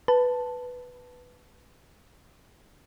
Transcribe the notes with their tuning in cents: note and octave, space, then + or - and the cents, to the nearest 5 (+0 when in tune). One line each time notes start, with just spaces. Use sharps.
B4 +0 A5 +0